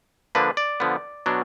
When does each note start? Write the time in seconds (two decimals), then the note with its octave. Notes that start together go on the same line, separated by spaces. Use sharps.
0.35 D3 F3 A#3 D4 B4
0.57 D5
0.80 D3 F3 B3
1.26 B2 F#3 D4